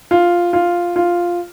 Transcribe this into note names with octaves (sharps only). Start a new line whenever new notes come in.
F4
F4
F4